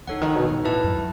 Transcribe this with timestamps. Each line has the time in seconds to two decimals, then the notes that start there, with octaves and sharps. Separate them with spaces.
0.07 C#3 D#4 A4 C#5 F#5
0.21 D#3
0.35 B2
0.50 B2
0.65 A2 E4 B4 E5 A5
0.83 F#2